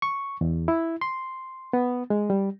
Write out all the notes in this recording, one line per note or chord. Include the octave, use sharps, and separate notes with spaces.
C#6
E2
E4
C6
B3
G#3
G3